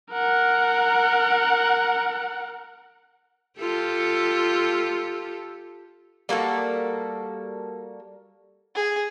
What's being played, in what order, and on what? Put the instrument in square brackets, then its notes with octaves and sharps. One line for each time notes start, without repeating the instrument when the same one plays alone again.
[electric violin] A#4 F#5
[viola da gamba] F4 G4 A4
[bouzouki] G3 A#3 F#4 A4
[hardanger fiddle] G#4